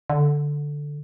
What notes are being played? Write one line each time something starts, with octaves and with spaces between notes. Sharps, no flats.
D3